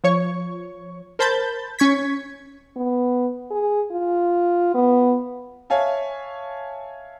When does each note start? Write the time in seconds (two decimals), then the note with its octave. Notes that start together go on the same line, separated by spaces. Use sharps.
0.04 F3 C#5 C#6
1.19 A#4 C5 A5 B5 G6 A6
1.79 C#4 C#6 G#6 B6
2.76 B3
3.51 G#4
3.91 F4
4.75 B3
5.70 C#5 E5 F5 G#5 A5